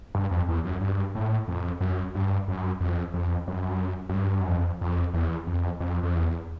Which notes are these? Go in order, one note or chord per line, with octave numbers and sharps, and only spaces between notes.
G2
F2
E2
F#2
G2
A2
F2
F#2
G2
F#2
F2
F2
F#2
F#2
G2
F#2
F2
F2
E2
F2
F2
F2
E2